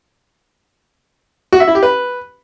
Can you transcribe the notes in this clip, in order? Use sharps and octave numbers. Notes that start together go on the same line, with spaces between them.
F#4
E5
E4
G4
B4